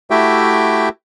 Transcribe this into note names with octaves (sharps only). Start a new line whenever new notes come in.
A3 E4 F#4 G4 E5 G5